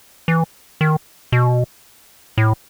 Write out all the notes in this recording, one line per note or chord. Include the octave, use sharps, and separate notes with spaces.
E3
D#3
B2
A2